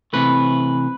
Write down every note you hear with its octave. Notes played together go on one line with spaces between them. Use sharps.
C3 E3 A3 B4